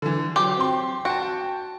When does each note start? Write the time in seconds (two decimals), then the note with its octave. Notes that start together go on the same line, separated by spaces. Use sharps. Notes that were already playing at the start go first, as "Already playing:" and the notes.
0.02 D3 E3
0.36 F#3 G4 C6
0.57 C4 C6
1.05 F#4 G5 A5